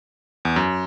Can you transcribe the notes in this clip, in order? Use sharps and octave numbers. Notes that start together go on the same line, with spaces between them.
E2
F#2